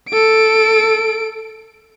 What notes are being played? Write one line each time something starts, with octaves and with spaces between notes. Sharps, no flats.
A4 D7